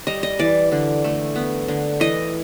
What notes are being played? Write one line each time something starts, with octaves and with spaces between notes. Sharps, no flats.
G3 D#5
D#5
E3 D5
D3
A3
B3
D3
E3 D#5